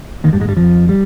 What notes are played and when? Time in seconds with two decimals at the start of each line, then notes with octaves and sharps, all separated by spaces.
0.24 D#2 D#3
0.33 G2 G3
0.40 G#2 G#3
0.48 G2 G3
0.57 F2 F3
0.89 G3